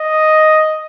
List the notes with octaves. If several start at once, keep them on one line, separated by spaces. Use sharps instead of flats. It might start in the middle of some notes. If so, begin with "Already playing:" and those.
Already playing: D#5